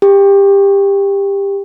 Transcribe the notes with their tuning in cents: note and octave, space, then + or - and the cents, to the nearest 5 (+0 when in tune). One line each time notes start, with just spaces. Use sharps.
G4 +20